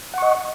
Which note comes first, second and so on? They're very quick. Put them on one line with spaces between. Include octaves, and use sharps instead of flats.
F#5 C#6 D#5